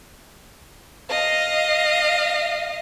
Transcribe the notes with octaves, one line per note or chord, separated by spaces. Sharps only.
D#5 F5